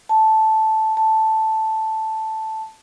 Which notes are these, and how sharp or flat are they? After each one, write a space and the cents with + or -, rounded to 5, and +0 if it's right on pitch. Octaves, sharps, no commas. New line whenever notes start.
A5 -5
A5 +0